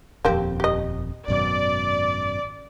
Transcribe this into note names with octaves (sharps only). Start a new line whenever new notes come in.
D#1 F2 A#3 C4 G4
G4 D#5
G#1 F#2 B2 D5